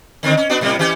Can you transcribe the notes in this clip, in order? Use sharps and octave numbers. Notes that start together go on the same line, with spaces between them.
D3 D#3 C4
C#4
B3 D4 F#4
A2 C3 G3
E3 C#4 G4